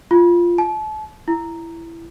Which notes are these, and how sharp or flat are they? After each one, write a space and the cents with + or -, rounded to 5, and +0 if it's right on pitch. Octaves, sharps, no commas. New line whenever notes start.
F4 -5
A5 -35
E4 +15